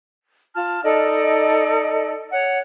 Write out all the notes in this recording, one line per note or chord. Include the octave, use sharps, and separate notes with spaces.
F4 A5 F6
D#4 A4 D5 D#5
C#5 F#5